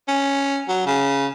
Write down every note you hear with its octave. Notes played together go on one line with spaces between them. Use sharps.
C#4
F#3
C#3